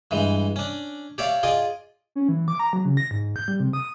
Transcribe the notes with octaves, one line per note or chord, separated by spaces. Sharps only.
G2 E3 G#3
C#4 D4
G4 C#5 D5 E5 F5
F4 G#4 D5 D#5
C#4
E3
D6
A#5
F#3
C#3
A#6
G#2
G6
G3
C3
D#6